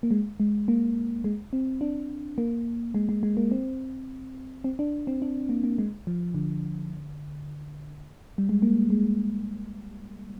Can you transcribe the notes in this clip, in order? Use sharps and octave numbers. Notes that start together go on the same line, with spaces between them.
A#3
G#3
G#3
A#3
G#3
C4
D4
A#3
G#3
G#3
G#3
A#3
C4
C4
D4
C4
D4
A#3
A#3
G#3
F3
D3
G3
G#3
A#3
G#3